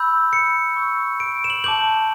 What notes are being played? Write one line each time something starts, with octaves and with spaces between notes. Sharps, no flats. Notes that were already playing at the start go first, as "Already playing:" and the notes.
Already playing: B5 E6 G6
C#7
C#6 E6 G6
D7
E7
F#7
A5 D6 G6 F#7